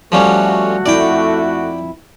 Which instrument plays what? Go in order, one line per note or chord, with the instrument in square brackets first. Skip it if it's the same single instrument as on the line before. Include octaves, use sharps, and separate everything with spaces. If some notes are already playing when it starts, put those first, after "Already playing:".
[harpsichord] F3 G3 C#4 [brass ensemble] A3 F#4
[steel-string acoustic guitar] F2 E4 [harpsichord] D5 G5